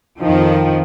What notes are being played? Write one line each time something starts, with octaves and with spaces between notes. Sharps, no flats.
F2 D#3 F3